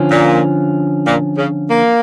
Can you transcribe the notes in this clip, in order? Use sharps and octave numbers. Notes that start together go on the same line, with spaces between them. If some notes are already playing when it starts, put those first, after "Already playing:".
Already playing: D3 F3 C#4
A#2
A#2
C#3
A#3